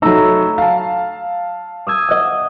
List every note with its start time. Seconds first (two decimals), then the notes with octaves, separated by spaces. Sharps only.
0.02 F#3 A3 D#4 A#5 B5 E6
0.58 F5 A5
1.87 D#6 E6 G#6
2.09 D#5 F#5